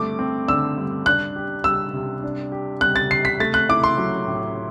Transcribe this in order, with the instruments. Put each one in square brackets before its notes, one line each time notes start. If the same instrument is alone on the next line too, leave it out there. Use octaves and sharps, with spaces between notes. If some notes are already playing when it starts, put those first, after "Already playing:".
Already playing: [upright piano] G2 D3 A3 C4 [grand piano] D6
[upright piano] C4
[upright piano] D3 [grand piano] E6
[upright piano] G2
[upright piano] D4 [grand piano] F#6
[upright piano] G4
[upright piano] G3 [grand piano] E6
[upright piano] C3
D4
G4
[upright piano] G3 [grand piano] F#6
[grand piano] A6
[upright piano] C3 [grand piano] C7
[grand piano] B6
[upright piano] A3 [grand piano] A6
[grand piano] F#6
[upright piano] E4 [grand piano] D6
[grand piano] C6
[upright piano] F#3
A2